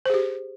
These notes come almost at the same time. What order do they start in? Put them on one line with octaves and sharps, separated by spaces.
C5 G#4 G4